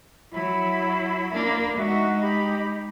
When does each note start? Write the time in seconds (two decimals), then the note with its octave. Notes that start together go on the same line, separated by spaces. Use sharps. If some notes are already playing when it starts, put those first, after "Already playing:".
0.32 F#3 E4 B5
1.32 A#3 D4
1.76 G#3 D#4 F#4 E5
2.20 G4 B5